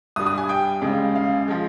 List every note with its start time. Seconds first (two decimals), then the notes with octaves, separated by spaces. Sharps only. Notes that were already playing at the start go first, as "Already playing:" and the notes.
0.16 G2 G3 D#6
0.26 D#6
0.38 G#5
0.49 G5
0.81 D#2 C#3 G#3
1.16 F5
1.48 F3 G#3